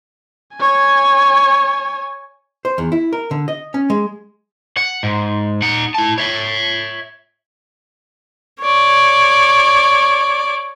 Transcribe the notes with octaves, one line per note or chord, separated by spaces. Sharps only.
C#5 G#5
C5
E2
E4
A#4
D3
D#5
C#4
G#3
F#5
G#2
D#4 F#5
E4 A5
C#5 E5
C#5 D5